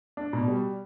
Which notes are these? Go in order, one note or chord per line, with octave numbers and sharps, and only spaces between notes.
D4
B2
G3